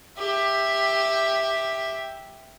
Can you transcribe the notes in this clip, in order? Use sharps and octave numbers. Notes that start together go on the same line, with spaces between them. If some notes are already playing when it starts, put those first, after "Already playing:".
G4 E5